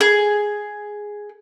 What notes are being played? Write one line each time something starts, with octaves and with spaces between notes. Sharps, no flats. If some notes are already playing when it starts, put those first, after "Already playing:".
G#4